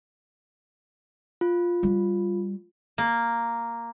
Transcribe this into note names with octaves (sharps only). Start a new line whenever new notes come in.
F4
G3
A#3